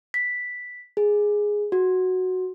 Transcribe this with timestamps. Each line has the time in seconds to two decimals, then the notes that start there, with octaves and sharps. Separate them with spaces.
0.14 B6
0.97 G#4
1.72 F#4